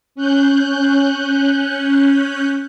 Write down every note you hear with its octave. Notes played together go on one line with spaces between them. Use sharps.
C#4 F#6 G6